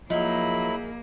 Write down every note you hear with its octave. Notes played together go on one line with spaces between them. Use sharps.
F3 F#3 A#3 D#4 E4 G#4 B5